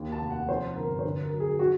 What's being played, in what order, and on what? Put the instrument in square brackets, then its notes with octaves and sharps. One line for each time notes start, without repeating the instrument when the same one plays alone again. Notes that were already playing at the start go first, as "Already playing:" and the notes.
Already playing: [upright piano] D#2
A5
F1
F#5
F2 C5
G1 A#4
C5
D3 B4
A#4
F#3
G#4
F#4